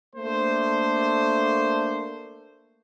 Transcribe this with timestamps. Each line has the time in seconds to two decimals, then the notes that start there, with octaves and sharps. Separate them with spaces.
0.16 A3 A#3 D4 C5